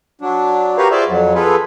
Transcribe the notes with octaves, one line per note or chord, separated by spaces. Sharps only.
F#3 D4
F#4 G4 A#4 B4 C#5 F5
F4 G#4 C5 D5 E5
F2 F#3
F4 G#4 A4 B4